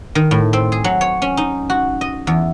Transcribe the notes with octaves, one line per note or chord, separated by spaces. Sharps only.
D#3
A2
C4
G#4
F#3
C#5
C#4
D#4
F#4
D#5
E2